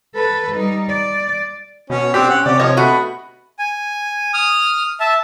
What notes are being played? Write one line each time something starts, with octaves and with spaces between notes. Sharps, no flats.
A4 B4
G3 D#4
D5
B2 C#4
C4 D4 G4
C#4 F#5
C3 C#4 G4 D5
F3 C#5 D#5
A3 B3 F#4 B5
G#5
D#6 F6
E5 A5